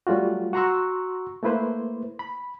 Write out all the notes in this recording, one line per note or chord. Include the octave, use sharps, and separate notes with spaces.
F#3 G3 A3 F4 F#4
F#4 F#5 A#5 C6 C#6 E6
A3 A#3 E4 B4 C5
B5